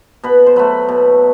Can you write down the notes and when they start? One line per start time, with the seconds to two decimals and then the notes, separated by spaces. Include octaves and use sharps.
0.24 B2 B4
0.46 C5
0.56 F#3 A3 B4
0.89 B2